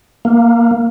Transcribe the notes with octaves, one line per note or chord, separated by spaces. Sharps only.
A#3